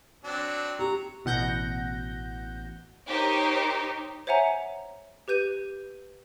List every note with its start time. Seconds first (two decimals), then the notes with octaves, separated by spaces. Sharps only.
0.24 F#3 C4 D4
0.79 G4 A#5 C#6
1.25 A1 B2 F#5 G6 A#6
3.06 D#4 G4 A#4 C5 C#5
4.27 C5 C#5 E5 F#5 G#5 A#5
5.28 G4 B4 G6 D#7